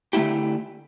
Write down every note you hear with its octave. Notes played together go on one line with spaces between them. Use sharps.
D3 A3 E4 G4